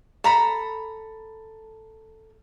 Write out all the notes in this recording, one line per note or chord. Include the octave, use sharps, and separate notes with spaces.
A4 A#5 B5